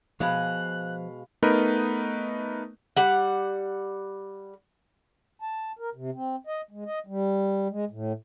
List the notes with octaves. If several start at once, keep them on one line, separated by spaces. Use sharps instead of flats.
B2 F3 G#3 F5 B5 F#6
A3 B3 D#4 A#4 B4
G3 F#5
A5
A#4
C3
C4
D#5
G#3
D#5
G3
G#3
A2